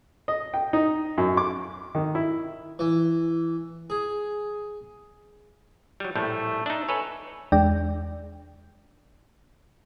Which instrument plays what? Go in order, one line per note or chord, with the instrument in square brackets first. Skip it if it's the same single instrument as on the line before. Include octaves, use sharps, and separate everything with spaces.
[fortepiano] D#5
G5
D#4
F#2
D6
D#3
E4
[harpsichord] E3
G#4
[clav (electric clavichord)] F#3 G3
[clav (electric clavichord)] A#1 A2 G3 [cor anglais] A3
[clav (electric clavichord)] D4 D#4 [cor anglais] E5
[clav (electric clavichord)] A4 B4 C#5 [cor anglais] G#5
[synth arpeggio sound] E2 G#3 D4 D5 G5